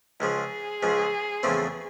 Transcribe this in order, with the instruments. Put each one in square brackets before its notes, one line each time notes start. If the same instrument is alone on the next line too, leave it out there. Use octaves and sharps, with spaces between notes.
[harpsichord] C#2 C#3 F3 [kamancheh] G#4
[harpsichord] C#2 C#3 F3
E2 C#3 F3 A3 C4